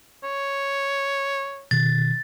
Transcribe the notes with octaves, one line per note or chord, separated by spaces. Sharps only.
C#5
B2 D#3 A6